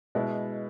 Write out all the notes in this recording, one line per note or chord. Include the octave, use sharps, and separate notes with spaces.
B2 G#3 B3 E4